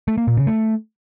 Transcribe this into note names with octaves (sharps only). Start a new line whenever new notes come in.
A3
A#3
A#2
C#3
A3